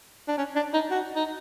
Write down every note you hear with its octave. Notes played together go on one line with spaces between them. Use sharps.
D4
C#4
D4
D#4
F#4
D#4